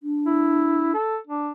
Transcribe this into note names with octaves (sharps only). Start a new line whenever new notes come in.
D4
E4
A4
D4